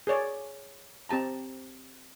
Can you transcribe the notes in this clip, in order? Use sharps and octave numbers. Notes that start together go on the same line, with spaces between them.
G#4 A#4 C#5 D5
C4 G4 A5 A#5